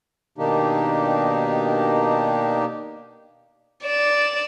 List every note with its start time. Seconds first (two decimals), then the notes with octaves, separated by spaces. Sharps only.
0.38 B2 D#3 A#3 D4 D#4 G4
3.85 D5 E7